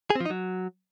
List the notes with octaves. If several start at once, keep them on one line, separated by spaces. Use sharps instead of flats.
G#4
C4
F3
D#4
F#3